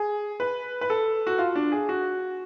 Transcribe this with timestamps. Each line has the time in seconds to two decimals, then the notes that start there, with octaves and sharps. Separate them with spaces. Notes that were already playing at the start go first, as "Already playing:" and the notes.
Already playing: G#4
0.40 B4
0.81 B4
0.90 A4
1.27 F#4
1.38 F4
1.55 D4
1.72 G#4
1.89 F#4